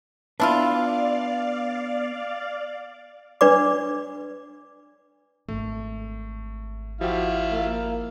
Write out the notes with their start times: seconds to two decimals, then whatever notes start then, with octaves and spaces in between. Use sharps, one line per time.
0.40 B3 D4 E4 F4 B4 D5 F5
3.41 D4 B4 D5 D6
5.49 G#1 A3
7.01 F3 E4 F#4 G4 F5
7.51 A#3